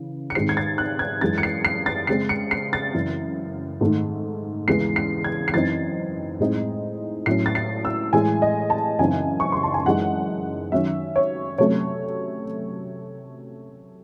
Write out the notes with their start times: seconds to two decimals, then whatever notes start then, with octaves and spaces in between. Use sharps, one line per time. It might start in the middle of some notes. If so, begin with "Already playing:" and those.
Already playing: C#3 E3
0.30 C#7
0.35 G#2 D#3 G#3 C4 C7
0.49 G#6
0.57 A6
0.78 F#6
0.99 G#6
1.21 F#2 E3 G#3 A6
1.38 C#7
1.43 C7
1.65 C7
1.86 A6
2.07 C#3 G#3 C4 C7
2.29 C#7
2.51 C7
2.73 A6
2.94 F#2 C#3 E3
3.81 G#2 D#3 A3
4.68 E2 C#3 E3 G#3 C7
4.96 C7
5.24 G#6
5.48 C7
5.54 F#2 E3 C4 D#4 A6
6.39 A2 G#3 C4 D#4
7.26 A2 F#3 C#4 C7
7.46 A6
7.55 C7
7.85 E6
8.13 A2 E3 G#3 G#5
8.42 D#5
8.70 A5
8.99 F#2 C#3 E3 C4 D#4 G#5
9.40 C#6
9.52 C6
9.63 A5
9.74 G#5
9.85 F#2 E3 G#3 D#4 F#5
10.72 D#3 F#3 C#4 E5
11.16 C#5
11.58 C3 F#3 A3 C#4 C#5